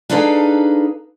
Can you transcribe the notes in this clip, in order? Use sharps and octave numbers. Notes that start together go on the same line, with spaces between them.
D4 D#4 G#4 A4 B4 F5